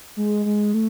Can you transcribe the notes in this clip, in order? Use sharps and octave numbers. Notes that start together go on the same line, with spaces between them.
G#3
G#3
A3